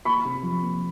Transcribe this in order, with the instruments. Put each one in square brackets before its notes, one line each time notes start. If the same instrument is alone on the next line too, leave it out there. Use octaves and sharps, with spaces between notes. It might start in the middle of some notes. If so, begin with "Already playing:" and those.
[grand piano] A#3 B5 C#6
C3
F3
A#3